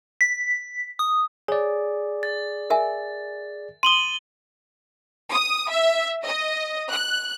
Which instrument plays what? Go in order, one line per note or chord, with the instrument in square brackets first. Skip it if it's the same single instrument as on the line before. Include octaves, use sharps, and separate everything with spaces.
[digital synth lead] B6
D#6
[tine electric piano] G#4 D5 [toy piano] C#5
[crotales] A6
[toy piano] A#4 E5 G#5
[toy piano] C6 D#6 [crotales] D#7 F#7 G7
[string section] D#6
E5
D#5
F#6